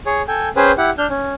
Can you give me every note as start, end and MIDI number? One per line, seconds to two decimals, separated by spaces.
0.06 0.22 68
0.06 0.22 73
0.28 0.49 69
0.28 0.49 79
0.28 0.49 80
0.56 0.72 61
0.56 0.72 68
0.56 0.72 71
0.56 0.72 72
0.56 0.72 79
0.78 0.90 64
0.78 0.90 67
0.78 0.90 78
0.98 1.07 62
0.98 1.07 89
0.98 1.07 91
1.10 1.34 61